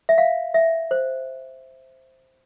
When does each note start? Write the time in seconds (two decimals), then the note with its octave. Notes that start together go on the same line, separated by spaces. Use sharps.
0.09 E5
0.18 F5
0.54 E5
0.91 C5